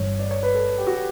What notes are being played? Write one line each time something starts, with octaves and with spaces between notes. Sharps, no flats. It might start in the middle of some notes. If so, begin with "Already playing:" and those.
Already playing: G1 G2 E3 G3 C#5
D5
C#5
B4
A4
G4
F#4
G4